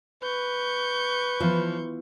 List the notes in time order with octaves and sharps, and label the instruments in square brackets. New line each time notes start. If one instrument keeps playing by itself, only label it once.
[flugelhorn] B4 [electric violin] C#6 G6
[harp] E3 B3 F4 [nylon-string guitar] F3